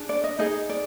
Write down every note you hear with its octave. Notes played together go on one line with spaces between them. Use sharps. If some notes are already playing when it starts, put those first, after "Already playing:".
Already playing: D4 G#4
D5
D#5
D#4 G#4 D#5
D5